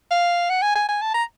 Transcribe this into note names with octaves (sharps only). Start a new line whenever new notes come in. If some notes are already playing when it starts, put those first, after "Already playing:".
F5
F#5
G#5
G#5
G#5
A5
A#5